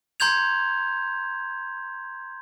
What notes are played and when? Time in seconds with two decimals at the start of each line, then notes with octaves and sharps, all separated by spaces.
0.20 A#5 C6 G6 G#6 F7